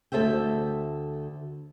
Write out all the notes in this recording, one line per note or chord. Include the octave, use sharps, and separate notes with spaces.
D2 A4 C5 E5 G5